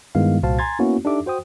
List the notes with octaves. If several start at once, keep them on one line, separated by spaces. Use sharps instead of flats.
G2 D#3 G#3 B3 E4 F5
C2 A#2 F#4 C5 F5 A5
G#5 A#5 C6 G#6 A6
A#3 B3 C#4 E4 F#4
D4 D#4 G4 A4 E5 D6
F#4 C5 G5 D#6